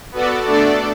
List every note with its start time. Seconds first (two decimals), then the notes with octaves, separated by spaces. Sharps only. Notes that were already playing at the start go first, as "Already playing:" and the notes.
0.12 B3 F#4 A4 D5
0.46 A3 D4 A4 D5